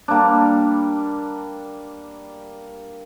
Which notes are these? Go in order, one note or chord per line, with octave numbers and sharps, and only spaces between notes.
G3 A#3 D4